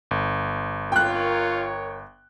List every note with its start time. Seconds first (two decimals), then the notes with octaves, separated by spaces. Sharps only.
0.11 G1
0.92 F4 A#4 C#5 G5 F#6